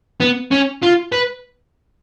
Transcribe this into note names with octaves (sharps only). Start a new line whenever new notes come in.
B3
C#4
F4
B4